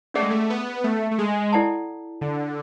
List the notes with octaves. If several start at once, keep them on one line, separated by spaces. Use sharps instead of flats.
A3 C#4 G#4 D5 F#5
G#3
A3
B3
A3
A3
G#3
E4 A4 D5 F#5 A5
D3